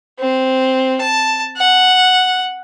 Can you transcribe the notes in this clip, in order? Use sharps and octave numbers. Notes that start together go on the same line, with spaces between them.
C4
A5
F#5